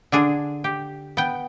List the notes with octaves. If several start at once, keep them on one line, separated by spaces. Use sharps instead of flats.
D3 D4 G#4
G4
B3 G5